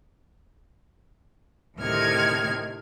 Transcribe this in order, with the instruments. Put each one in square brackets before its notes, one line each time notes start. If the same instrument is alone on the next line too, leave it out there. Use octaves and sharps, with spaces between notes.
[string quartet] D2 A2 C3 D#3 F6 G#6